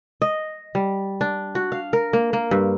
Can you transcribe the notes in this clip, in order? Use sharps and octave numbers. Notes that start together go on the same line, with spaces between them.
D#5
G3
D4
F#4
F5
A#4
A#3
A#3
G2